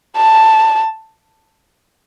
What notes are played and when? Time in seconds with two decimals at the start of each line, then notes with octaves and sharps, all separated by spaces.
0.17 A5